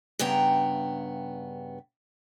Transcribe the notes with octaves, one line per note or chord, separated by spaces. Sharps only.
G2 C#3 B3 G5 A#5